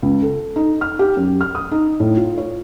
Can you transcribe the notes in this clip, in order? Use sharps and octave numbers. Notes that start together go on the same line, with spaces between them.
C#2
A4
D#4
F6
G4
F#2
F6
D#6
D#4
A2
F4
C#5